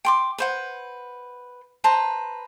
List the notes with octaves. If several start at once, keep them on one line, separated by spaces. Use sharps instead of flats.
G5 C6 D6
B4 C5 F#5
B4 C5 A5 A#5